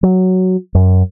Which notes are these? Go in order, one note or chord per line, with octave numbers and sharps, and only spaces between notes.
F#3
F#2